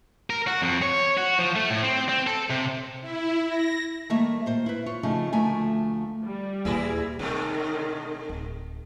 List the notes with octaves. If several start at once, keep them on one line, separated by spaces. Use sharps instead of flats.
A#4
F#4
F2
C#5
F#4
F3
A3
A2
C4
C4
A4
C3
E4
A#6
D#3 G3 A3 A#3 C#5 E5
A#2 C5
E4 B4
F4 C#5
C#3 F3 A3 D#4 G#4
D2 F3 A3 A#4 G#5
G3
D#2 A#2 E3 E4 G#4
B2 D#3 G#3 A3 D#4
D1